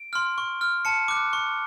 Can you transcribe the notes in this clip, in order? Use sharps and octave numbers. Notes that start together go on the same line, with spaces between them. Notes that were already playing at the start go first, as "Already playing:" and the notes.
Already playing: D7
C6 F6
C#6
F6
A5 C#7
D6 F#6
C#6